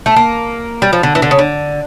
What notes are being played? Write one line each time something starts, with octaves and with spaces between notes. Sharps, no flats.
A3
A#3
G3
F3
D3
E3
D3
C#3
D3